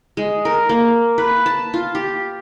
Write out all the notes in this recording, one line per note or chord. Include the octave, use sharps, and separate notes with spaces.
G#3
A#4
A#3
B4
A5
F4
G4